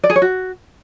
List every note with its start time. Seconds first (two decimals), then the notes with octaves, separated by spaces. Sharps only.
0.04 D5
0.10 G#4
0.16 C#5
0.22 F#4